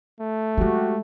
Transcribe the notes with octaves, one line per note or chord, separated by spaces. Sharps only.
A3
F#3 G#3 F#4 G4